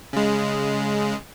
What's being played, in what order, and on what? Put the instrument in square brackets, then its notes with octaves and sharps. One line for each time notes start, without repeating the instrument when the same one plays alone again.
[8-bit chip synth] C#3 G#3